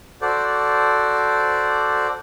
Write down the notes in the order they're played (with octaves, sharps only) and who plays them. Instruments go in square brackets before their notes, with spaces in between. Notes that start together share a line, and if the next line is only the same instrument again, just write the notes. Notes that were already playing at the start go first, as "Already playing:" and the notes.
[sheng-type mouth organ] F#4 A4 C5 D5